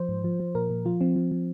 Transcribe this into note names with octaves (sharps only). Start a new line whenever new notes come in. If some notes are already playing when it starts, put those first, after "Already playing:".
Already playing: F3 C5
G#2
F3
F3
A#2 A#4
A#2
F3 F4
F3 C4
F3
F3